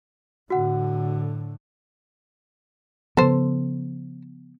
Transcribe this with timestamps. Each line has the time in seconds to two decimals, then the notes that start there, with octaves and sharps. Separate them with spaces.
0.50 A2 D3 F#4 F#5
3.17 C#3 F3 B3 A4 C5